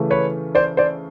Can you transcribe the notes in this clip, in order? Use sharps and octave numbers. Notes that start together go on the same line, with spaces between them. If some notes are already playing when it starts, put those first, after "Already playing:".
Already playing: C#3 E3 A3 C#4
B4 C#5
C5 D5
C5 D5